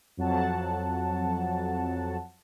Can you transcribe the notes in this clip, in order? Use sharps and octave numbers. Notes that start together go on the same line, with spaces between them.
F2 F#3 F#5 A5